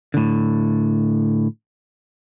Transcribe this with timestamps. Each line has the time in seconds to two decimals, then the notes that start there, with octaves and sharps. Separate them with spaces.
0.14 A2 D3